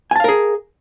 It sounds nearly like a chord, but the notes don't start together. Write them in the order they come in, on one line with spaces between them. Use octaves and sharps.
G#5 A5 F5 A#4 G#4